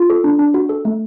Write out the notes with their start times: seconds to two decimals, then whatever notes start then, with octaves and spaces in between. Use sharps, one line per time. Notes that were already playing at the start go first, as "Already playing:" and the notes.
Already playing: F4
0.10 A4
0.24 D4
0.39 D4
0.54 F#4
0.69 A4
0.85 A3